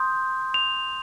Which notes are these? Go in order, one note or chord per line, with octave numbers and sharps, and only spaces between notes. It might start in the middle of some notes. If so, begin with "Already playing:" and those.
Already playing: C6 D#6 G6
F7